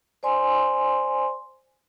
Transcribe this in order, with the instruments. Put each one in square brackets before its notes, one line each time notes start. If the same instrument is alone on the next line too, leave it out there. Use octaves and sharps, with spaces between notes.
[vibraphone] C5 D5 G#5 C6